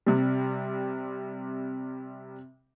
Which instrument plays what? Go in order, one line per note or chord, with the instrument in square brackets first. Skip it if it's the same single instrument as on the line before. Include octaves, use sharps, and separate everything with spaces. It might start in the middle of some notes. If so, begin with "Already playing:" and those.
[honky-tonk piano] C3 G3